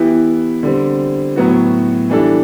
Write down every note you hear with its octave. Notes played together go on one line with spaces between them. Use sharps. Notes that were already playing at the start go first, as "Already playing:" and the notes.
Already playing: E3 B3 E4 G4
D3 G3 C4
A2 F#3 B3 F#4
E3 G3 D4 A4